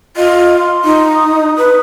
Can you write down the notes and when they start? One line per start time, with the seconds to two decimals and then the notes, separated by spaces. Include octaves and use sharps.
0.17 F4 D#5
0.59 C6
0.84 D#4
1.15 D#6
1.57 B4